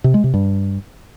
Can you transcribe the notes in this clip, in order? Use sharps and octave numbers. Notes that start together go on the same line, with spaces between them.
C3
G#3
C3
G2